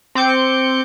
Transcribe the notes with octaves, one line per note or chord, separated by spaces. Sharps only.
C4 D6 G6 C#7